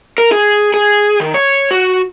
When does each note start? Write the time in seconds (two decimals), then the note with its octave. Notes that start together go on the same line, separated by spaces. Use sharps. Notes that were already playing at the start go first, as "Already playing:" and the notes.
0.18 A#4
0.32 G#4
0.74 G#4
1.20 D#3
1.34 C#5
1.71 F#4